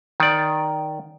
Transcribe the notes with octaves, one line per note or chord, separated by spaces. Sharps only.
D#3 D5